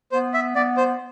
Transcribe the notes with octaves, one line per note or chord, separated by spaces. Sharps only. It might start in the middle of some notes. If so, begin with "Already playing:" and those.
B3 C5
E5
B3 D5
C5